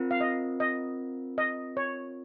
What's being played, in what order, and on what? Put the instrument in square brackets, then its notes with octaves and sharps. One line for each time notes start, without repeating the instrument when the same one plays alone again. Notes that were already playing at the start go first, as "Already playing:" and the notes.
Already playing: [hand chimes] C4 F4 A#4
[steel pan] F5
D#5
D#5
D#5
C#5